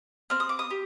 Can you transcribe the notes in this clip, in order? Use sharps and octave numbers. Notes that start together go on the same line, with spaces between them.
C4 F6
D#6
D6
D#6
G4